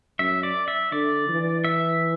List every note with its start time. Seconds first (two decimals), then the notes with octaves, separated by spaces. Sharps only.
0.19 F#2 E5
0.43 D5
0.68 E5
0.91 D3 D5
1.28 E3
1.64 E5